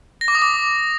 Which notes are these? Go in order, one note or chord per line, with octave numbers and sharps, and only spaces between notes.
A#6
D6
D#6
D6